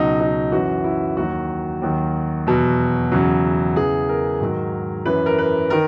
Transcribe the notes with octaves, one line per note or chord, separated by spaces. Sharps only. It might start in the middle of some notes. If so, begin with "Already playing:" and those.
Already playing: C#2 B2 F#3 D#4
D#4
F#2 E3 F#4
E4
D#2 D#3 F#3 F#4
D#2 D#3 F#3
E2 B2 F#3
E2 C#3 F#3
E2 C#3 E3 G#4
A#4
G#2 D#3 F#3
F#2 E3 B4
A#4
B4
D#3 A#4